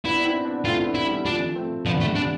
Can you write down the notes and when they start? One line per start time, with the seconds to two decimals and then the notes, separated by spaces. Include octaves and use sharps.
0.05 B3 D4 E4
0.19 D4
0.24 C4 E4
0.45 B3 D4
0.65 A3 C4 F4
0.78 E4
0.85 B3 D4
0.95 E4
1.05 G3 B3
1.25 F3 A3 D4
1.56 A3 C4
1.86 F3 B3 D4
2.00 A3
2.05 G3 B3
2.16 D4